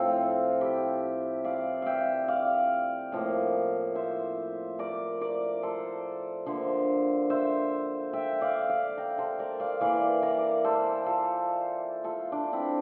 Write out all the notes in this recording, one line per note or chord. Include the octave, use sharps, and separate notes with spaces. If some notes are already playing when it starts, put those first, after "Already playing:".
Already playing: A2 F3 C4 F4 A4
E4 G4
D5 F5
E5 F5 G5
D5 F5
A2 F3 A#3
C5 E5
A#4 D5
A#4 D5
A4 C5
D3 F3 A#3 C5 E5
C5 E5
E5 G5
D5 F5
D5 F5
G5 A#5
A4 C5
A#4 D5
D5 F5
E3 A#3 D5 F5
A#4 D5
A4 C5
F4 A4
F4 A4
D4
C4 E4